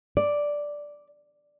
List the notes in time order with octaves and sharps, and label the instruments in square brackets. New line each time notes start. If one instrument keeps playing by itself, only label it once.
[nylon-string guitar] D5